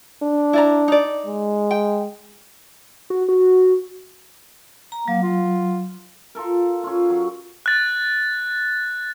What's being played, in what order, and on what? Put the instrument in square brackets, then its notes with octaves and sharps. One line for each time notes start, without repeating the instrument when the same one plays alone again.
[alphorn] D4
[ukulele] E4 D5 A#5
D#4 D5
[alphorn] G#3
[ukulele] G5
[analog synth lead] F#4
F#4
[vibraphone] A#5
[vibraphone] F#3 [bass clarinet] A#3
[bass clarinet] F4
[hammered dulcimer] F4 A4 A#4
C#4 F4
F#3
[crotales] F#6 A6